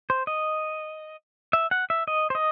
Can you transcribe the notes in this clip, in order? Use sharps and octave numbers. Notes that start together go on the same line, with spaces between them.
C5
D#5
E5
F#5
E5
D#5
C5
D#5